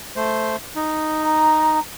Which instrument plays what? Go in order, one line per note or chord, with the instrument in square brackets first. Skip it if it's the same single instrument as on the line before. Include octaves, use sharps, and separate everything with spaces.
[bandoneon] A3 C5
D#4
[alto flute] A#5